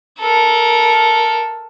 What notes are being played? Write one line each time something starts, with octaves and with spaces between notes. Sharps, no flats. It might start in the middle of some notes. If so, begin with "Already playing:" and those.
A4 A#4